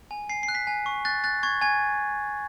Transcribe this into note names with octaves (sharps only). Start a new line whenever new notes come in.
G#5
G#5 C7
C7
F#6
B6
G#5
C#6
F#6 A6
F#6 A6
C#6 G#6
G#5 G#6